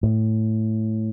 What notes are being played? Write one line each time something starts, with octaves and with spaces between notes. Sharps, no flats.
A2